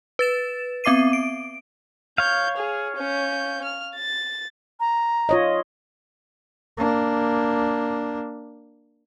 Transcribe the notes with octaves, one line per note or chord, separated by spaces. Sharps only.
B4 A6 E7
B3 C4 E5 D6 C7 D#7
D7
C#5 F5 G6
G#4
C#4 G6
F6
A6
A#5
F4 C#5 D#5
A#3 D4